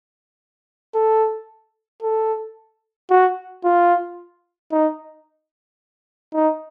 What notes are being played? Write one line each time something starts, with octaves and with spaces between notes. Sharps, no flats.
A4
A4
F#4
F4
D#4
D#4